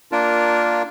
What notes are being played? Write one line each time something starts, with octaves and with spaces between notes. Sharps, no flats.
A#3 D4 F4 A#4